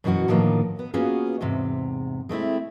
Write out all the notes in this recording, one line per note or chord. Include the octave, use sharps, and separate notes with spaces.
F#2 B2 E3 C#4 F#4
A2 D3 D#3 F3 A#3 B3
B3
A#3 B3 C#4 F4 F#4 G#4
E2 G#2 C3
G#3 A3 C4 E4